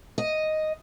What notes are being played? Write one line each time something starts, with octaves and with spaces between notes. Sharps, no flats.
D#5